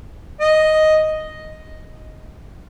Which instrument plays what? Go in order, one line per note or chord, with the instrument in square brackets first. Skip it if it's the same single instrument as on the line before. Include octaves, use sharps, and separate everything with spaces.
[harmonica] D#5